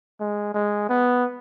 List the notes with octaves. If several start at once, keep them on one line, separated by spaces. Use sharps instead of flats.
G#3
G#3
B3